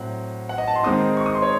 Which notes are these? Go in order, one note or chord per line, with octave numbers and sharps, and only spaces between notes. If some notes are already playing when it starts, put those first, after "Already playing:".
Already playing: A2 F#3 C4 F#5
F#5
D#5
A5
C6
D#3 G#3 C4 D#4 D#6
C#6
D#6
C6
C#5